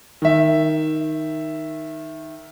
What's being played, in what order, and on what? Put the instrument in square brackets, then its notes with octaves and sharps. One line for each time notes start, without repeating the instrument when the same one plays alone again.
[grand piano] D#3 E5